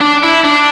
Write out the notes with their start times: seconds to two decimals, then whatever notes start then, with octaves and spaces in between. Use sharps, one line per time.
0.01 D4
0.23 E4
0.44 D4